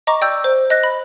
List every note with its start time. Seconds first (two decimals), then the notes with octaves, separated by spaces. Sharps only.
0.07 D#5 A#5 C#6 D6
0.21 D5 G5 E6 G6
0.44 C5
0.70 D#5 F#6 A#6
0.83 B5